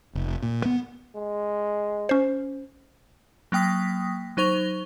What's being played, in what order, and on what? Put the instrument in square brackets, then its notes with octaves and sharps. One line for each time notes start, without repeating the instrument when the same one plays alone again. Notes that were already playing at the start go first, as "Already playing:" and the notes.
[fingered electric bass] F1
A#2
B3
[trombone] G#3
[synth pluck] C#4 C5
[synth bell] F#3 A#3 G5 D#6 B6
F#3 D#4 C5 C#6 F7 G7